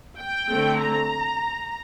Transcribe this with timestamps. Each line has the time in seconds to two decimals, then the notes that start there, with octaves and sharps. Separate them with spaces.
0.18 G5
0.49 D3 A3 C4
0.79 A#5